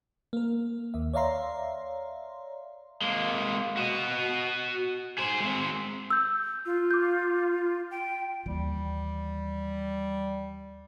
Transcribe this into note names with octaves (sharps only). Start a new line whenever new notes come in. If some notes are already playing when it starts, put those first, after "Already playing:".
A#3 A#4
D#2 E5
C#5 D5 E5 F5 A#5 C6
G#3 A#3
F#4 D#5
G#4 C5
G#3 C4
E6 G6
F4
D6 G6
G5
D#2 E3 G3